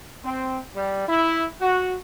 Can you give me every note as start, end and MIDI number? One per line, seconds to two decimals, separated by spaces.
0.24 0.59 60
0.76 1.06 55
1.08 1.46 64
1.61 1.95 66